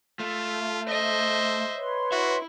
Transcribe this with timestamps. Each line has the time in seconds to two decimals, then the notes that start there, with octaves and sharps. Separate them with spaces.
0.20 A3 F4
0.88 C5 D#5 E5
1.75 B4 C#5 C6
2.12 E4 F#4 E5